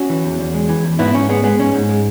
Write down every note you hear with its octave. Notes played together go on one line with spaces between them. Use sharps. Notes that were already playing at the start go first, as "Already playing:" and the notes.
Already playing: C#4 F#4
E3
E2
E2
G#3
E3
E2
G#2 B3 E4
G#2 C#4
G#3 B3
G#3 B3
G#2 C#4
G#2
G#3